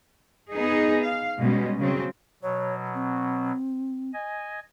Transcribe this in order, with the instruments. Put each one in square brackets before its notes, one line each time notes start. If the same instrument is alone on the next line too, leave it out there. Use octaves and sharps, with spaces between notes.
[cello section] B3 D#4 G#4 D#5
F5
B2 G3 G#3 C#4
C#3 F#3 C4
[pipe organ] B2 F#3 [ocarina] C#5
[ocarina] C4
[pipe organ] D#5 G#5